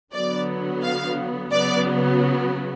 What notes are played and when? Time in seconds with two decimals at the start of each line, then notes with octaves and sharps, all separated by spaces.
0.14 D3 F#3 B3 D5
0.83 F5
1.51 C#3 F#3 B3 D5